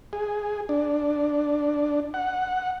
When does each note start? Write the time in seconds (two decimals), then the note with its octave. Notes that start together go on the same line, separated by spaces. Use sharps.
0.13 G#4
0.69 D4
2.14 F#5